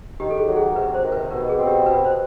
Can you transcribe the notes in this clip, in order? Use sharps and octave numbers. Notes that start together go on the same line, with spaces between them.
D#3 G4
A4
G#4
F#3
G#4
C3 B4
C5
D#3
B4
B2 A#4
G#4
C4
G4
B2 B4
C5